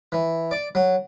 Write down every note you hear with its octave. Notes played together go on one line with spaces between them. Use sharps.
E3
D5
F#3